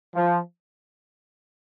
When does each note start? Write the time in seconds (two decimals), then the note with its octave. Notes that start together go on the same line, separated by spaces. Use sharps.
0.15 F3